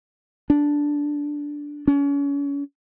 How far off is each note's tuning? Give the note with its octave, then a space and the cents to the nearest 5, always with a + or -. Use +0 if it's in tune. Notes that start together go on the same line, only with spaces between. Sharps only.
D4 -5
C#4 +35